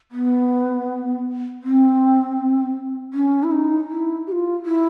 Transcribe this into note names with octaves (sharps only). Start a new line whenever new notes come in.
B3
C4
C#4
E4
D#4
E4
G4
F4
E4